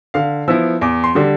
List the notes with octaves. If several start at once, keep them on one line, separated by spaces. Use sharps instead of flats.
D3 F5
F3 B3 E4 E6
E2 D6
C6
D3 G3